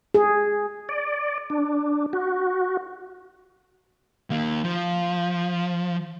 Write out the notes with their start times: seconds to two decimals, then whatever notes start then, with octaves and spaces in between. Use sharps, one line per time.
0.14 G#4
0.89 D5
1.50 D4
2.13 F#4
4.30 D#2 A#3
4.64 F3